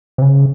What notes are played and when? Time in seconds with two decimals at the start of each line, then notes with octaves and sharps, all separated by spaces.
0.18 C3
0.22 C#3